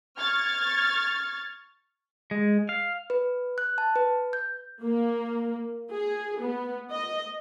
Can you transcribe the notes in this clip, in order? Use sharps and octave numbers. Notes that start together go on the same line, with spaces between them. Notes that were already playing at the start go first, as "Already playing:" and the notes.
C#6 F6 G#6 A6
G#3
F5
B4
F#6
A5
B4
G6
A#3
G#4
B3
D#5